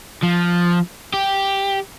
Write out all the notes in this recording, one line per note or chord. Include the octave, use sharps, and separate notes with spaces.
F3
G4